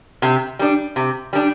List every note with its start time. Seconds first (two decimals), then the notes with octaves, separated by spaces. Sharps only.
0.22 C3
0.59 G3 D4
0.96 C3
1.33 G3 D4